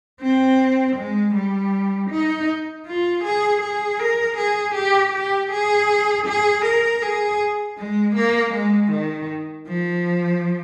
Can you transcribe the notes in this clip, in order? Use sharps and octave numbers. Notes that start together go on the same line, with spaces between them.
C4
G#3
G3
D#4
F4
G#4
G#4
A#4
G#4
G4
G4
G#4
G#4
A#4
G#4
G#3
A#3
G#3
D#3
F3